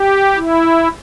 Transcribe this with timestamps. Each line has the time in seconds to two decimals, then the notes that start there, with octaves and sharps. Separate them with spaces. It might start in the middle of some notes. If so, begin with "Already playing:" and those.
Already playing: G4
0.36 E4